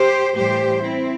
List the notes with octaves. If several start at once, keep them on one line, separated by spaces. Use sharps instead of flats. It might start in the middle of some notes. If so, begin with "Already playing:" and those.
Already playing: G4 C5
A2 E3 G3 G4 C5
C4 E4